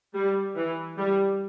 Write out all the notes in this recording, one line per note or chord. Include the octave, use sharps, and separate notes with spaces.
G3
E3
G3